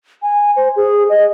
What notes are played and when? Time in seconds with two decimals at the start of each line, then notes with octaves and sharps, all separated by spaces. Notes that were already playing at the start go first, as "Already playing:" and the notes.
0.22 G#5
0.56 C5
0.76 G#4
1.09 D#5